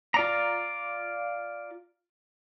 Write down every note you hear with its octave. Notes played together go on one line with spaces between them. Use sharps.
F4 D5 A#5